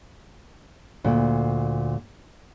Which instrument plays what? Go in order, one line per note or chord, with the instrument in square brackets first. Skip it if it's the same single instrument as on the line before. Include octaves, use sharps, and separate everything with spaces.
[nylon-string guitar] D2 A#2